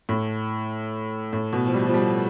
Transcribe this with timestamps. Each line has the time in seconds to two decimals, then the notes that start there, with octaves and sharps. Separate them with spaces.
0.09 A2
1.33 A2
1.53 B2
1.66 F3
1.74 G3
1.86 F3
1.94 G3